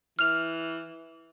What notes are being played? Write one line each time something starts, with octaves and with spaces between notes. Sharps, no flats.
E3 F6 F7